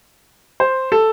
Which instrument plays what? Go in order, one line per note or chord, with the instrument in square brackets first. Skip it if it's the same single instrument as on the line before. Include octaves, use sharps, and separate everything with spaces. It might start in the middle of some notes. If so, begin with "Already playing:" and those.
[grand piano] C5
A4